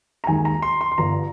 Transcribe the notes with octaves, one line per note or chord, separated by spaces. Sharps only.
A#5
D#2 D#3 G#3 G#5
A#5
C6
C6
C6
G1 G2 D3 A#5